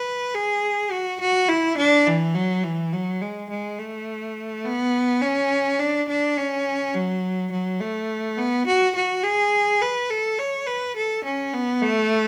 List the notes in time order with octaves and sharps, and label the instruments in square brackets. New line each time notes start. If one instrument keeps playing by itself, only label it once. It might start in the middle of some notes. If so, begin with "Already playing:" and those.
Already playing: [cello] B4
G#4
F#4
F#4
E4
D4
E3
F#3
E3
F#3
G#3
G#3
A3
B3
C#4
D4
D4
C#4
F#3
F#3
A3
B3
F#4
F#4
G#4
B4
A4
C#5
B4
A4
C#4
B3
A3